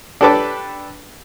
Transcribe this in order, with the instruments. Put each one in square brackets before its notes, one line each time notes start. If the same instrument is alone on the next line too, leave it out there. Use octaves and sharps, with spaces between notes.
[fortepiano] D4 G4 A4 B4 D6